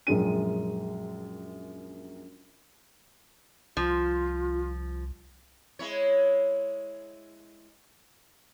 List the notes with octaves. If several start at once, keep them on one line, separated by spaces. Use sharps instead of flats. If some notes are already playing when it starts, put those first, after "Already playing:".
A#1 F#2 G#3 C#4 D#7
C2 F3 F4
G#3 E4 C#5